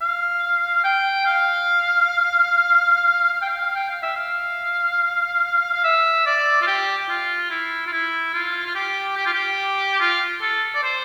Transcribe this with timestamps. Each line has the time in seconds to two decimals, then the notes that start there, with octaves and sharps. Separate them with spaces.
0.01 F5
0.84 G5
1.26 F5
3.34 F5
3.42 G5
3.49 F5
3.76 G5
3.89 F5
4.03 E5
4.16 F5
5.73 F5
5.84 E5
6.26 D5
6.62 F4
6.67 G4
7.09 F4
7.51 E4
7.87 F4
7.92 E4
8.34 F4
8.66 F4
8.75 G4
9.17 G4
9.26 F4
9.34 G4
10.00 F4
10.41 A4
10.75 D5
10.84 C5